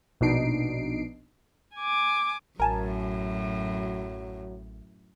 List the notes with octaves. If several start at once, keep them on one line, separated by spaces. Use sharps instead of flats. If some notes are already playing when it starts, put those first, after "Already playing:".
A#1 B2 D4 D#4 C7 D7
G#5 D6
A1 F#2 A2 F#3 A#4 G#5 A5